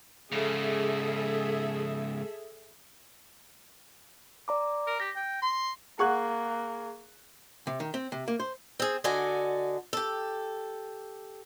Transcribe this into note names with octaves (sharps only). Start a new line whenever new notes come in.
G#2 C#3 G#4 A4 E5
D5 A#5 D6
A#4
G4 A#6
G5
C6
A#3 G#4 F#5 C#6 F#6
C3
D#3
C4
C3
A#3
C5
C4 G#4
D3 F#4 D5 D#5 G#5
G4 A4